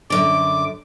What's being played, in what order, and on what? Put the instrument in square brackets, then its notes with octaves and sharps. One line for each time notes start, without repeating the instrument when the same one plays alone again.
[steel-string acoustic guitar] F#2 D3 [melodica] D6